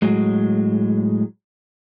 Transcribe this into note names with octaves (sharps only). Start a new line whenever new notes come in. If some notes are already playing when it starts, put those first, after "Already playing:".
A2 F#3 G#3